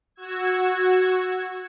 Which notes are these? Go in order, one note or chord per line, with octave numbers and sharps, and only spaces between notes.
F#4 E6 G#6